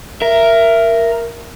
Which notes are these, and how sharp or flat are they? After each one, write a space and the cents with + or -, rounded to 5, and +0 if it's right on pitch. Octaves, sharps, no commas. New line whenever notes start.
A#4 +0 E5 +20